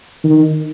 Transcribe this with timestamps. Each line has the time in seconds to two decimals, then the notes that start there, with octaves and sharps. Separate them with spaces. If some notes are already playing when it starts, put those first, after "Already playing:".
0.24 D#3